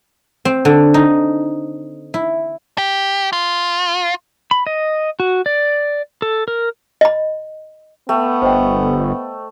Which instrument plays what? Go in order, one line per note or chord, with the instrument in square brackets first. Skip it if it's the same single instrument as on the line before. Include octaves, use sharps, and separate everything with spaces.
[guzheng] C4
D3
D#4
E4
[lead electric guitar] G4
F4
[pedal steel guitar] B5
D#5
F#4
D5
A4
A#4
[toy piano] D#5 B5
[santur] A3 [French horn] B3 [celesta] G5
[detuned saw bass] G1 [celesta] C5 D#5 G5